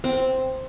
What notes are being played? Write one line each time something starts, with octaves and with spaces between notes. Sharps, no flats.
C4